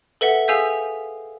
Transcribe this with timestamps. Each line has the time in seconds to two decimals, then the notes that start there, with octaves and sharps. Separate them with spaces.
0.21 A4 B4 E5 F#5
0.48 G#4 F5 G#5 E6 G6 B6